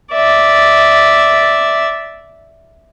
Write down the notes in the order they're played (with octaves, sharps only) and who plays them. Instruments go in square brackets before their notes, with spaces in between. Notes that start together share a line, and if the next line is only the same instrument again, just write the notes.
[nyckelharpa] D5 E5